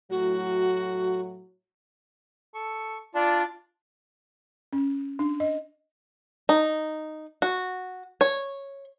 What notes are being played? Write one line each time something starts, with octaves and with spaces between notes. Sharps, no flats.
A2 F#3 F#4
A4 C#6
D4 F4 D5 A5
C#4
D4
D#5
D#4
F#4
C#5